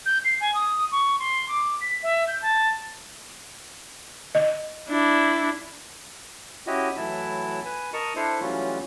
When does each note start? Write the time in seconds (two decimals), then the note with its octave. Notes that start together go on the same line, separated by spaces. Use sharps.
0.06 G6
0.25 C7
0.41 G#5
0.54 D#6
0.92 C#6
1.19 C6
1.49 D6
1.81 B6
2.03 E5
2.27 G6
2.42 A5
4.35 D#5
4.89 D4 E4
6.67 C#4 E4 F#4 G4 D#5
6.97 A2 E3 F#3 E4 A5
7.65 B4 G#5
7.93 A#4 D#5 A5 A#5 C#6
8.16 D4 E4 A4 C5
8.41 A2 E3 F#3 G3 C#4 F4